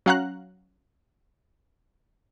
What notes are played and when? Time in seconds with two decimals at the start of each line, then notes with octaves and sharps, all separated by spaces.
0.06 F#3 C#4 F5 F#5 A#5 F#6